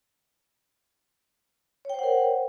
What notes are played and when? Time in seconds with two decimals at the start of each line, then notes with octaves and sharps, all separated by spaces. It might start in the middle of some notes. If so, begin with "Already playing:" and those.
1.85 C#5
1.90 G5
1.94 C5
1.99 F#5
2.03 A#4